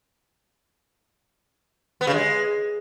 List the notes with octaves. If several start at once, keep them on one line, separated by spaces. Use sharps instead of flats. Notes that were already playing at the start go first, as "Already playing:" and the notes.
B3
C#3
G#3